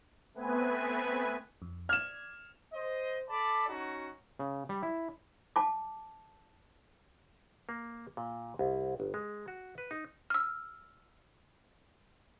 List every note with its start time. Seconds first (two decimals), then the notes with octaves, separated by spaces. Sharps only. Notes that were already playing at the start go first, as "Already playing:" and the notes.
0.34 A3 B3 C4 B4 G#5
1.62 F2
1.89 D5 F6 G#6 E7
2.74 C5 D#5
3.29 A4 D5 A5 B5
3.69 C#4 D#4 F#4
4.39 C#3
4.69 G3
4.83 E4
5.56 A5 D6
7.69 A#3
8.17 A#2
8.59 C2
9.00 G1
9.14 G#3
9.48 F#4
9.78 B4
9.91 D#4
10.30 E6 F6